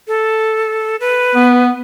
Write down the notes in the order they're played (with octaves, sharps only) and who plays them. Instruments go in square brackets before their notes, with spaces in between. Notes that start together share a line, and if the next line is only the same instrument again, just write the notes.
[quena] A4
B4
[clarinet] B3